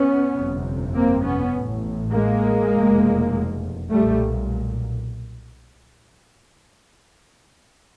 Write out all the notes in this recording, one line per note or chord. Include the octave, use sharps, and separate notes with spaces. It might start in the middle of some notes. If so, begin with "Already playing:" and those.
Already playing: B3 C#4
G1 F2 C3
A#3 C4
B3 C#4
A1 A2
G#3 A#3
F1 E2 B2
B1 A#2 G3 A3